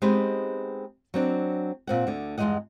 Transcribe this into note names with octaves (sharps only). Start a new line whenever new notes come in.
G#3 B3 C4 D#4 G4 B4
F#3 C4 D4
A#2 C4 F#5
D2 D3
E2 G2 G#3 D#4 D#5 F#5